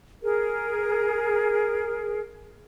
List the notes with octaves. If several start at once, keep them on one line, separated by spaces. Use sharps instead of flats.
G#4 A#4